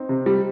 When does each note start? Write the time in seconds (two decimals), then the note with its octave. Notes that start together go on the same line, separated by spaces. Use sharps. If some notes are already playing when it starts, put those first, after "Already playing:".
Already playing: C4 D#4
0.09 C3
0.26 G3